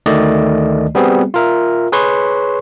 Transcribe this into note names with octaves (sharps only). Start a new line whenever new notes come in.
D2 D#3 A3 D5 D#5
G3 B3 C4 F#4 G#4
F4 A#4 E5
G#4 B4 C#5 C6 C#6